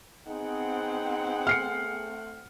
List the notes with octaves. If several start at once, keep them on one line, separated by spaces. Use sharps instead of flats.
B3 C4 D#4 G#4 F#5 G5
A3 F6 C7 C#7